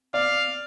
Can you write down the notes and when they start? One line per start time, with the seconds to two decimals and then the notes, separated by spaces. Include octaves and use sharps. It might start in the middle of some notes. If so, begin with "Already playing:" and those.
0.14 D5 F5